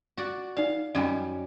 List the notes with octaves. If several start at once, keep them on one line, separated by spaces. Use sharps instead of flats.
F#4 D5
D#4 D5 F5
F#2 G3 D#5 G#5